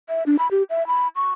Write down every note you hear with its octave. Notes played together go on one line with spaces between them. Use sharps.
E5
D4
B5
G4
E5
B5
C#6